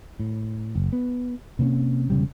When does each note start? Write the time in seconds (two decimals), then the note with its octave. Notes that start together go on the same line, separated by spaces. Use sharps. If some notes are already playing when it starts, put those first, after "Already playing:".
0.20 A2
0.76 F#1
0.93 B3
1.59 C3 A#3 C4 C#4
2.10 E1 C#3 G3